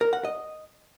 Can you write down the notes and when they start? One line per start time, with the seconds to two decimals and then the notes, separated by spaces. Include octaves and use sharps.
0.01 A#4
0.13 F#5
0.25 D#5